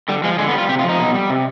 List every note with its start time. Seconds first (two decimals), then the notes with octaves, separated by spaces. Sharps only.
0.09 D3 G3
0.24 F3 G#3
0.39 D3 G#3
0.48 B3
0.54 G3 F4
0.69 C3 G4
0.79 F4
0.84 F3 D#4
0.99 B2
1.14 G3
1.30 C3